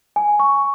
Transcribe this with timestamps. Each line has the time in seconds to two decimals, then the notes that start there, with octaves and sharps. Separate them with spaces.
0.16 G#5
0.40 C#6